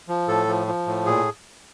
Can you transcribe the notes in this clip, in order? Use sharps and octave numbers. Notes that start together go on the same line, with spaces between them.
F3
A2 A4
F3
F3
A2
A#2 G#4